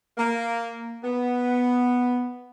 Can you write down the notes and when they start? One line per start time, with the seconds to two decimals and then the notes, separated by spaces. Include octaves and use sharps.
0.18 A#3
1.04 B3